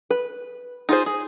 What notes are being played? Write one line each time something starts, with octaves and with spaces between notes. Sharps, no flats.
B4
D#4 F4 G#4 C5
G#4